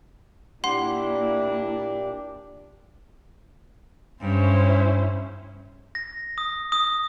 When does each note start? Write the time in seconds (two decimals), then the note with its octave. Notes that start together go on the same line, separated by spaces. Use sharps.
0.64 A#2 A#3 D4 E4 G4 F#5 C6
4.21 G2 C#4 E4 C5
5.95 A#6
6.38 D#6
6.72 D#6